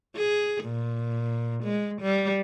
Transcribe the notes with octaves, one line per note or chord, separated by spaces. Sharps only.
G#4
A#2
G#3
G3